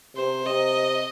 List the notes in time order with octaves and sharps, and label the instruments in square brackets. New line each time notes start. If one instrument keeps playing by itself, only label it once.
[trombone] C3 [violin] C5
[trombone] C3 [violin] D#5